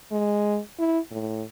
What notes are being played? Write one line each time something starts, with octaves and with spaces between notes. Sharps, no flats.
G#3
E4
A2